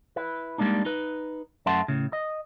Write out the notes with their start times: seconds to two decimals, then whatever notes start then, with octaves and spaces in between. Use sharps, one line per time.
0.16 E4 B4
0.58 G3 G#3 A#3 D4 D#4
0.85 D#4 B4
1.66 F#2 A3 E5 F#5 A5 C6
1.88 A2 C#3
2.13 D#5